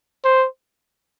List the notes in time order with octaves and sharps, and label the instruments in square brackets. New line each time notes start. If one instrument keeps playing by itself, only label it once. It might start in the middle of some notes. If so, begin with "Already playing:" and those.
[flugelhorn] C5